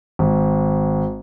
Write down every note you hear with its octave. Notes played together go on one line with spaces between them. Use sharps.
G#1